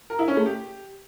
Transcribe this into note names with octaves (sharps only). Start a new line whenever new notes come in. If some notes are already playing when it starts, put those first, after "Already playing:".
A#4
E4
C#4
A3
G4